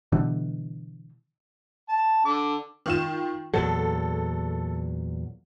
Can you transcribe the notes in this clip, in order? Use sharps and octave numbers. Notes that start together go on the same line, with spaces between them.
B2 D3 E3 G3
A5
D3 D6
D#3 F4 E7
E2 A#2 F#3 A4